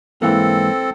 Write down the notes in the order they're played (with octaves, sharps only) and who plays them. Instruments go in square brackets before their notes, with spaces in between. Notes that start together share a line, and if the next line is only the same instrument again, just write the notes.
[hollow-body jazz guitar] G#2 E3 A#3 [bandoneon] C4 A4